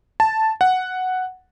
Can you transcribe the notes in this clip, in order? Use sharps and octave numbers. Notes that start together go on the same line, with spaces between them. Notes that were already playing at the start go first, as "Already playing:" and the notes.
A5
F#5